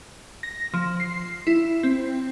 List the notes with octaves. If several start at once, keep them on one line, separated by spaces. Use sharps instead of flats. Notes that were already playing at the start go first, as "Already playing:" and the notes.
A#6
F3
C7
E4
C4